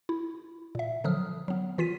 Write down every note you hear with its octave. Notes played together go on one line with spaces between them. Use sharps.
E4
A#2 E5
D3 F3 F#3 D#6 F6
F#3 B3
E3 F4 B6 D#7